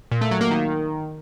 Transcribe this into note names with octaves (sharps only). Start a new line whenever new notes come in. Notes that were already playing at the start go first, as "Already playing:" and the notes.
A#2
A3
F#3
A#3
D#3